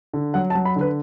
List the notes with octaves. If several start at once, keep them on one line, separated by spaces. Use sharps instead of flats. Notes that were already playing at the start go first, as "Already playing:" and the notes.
D3
F#3 F#5
A5
F#3
B5
D3
B4